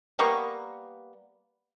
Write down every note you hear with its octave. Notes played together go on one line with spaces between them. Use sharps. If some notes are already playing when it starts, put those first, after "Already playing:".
G3 A#3 B3 C#6